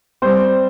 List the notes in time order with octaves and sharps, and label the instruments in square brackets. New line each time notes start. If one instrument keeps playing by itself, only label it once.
[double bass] G3 [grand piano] C4 C5